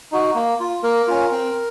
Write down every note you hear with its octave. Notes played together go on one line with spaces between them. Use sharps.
D#4 F#4
A#3
F4
A#3 A#4
C#4 F4
C4